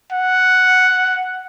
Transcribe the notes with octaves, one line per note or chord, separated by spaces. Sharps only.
F#5